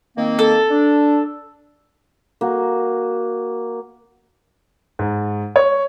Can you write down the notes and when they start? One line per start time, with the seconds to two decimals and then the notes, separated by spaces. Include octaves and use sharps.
0.17 D#3 A#3 C4
0.39 A4
0.70 D4
2.41 A#3 F#4
4.99 G#2
5.56 C#5